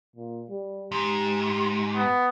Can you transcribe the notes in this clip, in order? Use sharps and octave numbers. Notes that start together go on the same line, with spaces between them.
A#2
G3
G#2 G4
B3